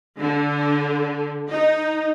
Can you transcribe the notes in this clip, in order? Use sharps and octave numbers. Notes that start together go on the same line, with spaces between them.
D3
D#4